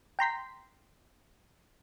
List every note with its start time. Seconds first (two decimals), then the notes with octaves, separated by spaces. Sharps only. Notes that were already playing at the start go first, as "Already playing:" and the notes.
0.19 G5 A#5 C6 B6